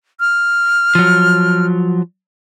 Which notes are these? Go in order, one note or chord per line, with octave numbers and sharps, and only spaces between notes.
F6
F3 F#3